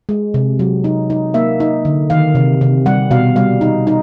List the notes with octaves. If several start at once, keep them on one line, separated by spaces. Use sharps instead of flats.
G#3
C3
F#3
D#4
D#4
A#3 E5
D#4
D3
D#3 F5
C3
C3
G3 F#5
B2 F5
G3 F5
D#4
D#4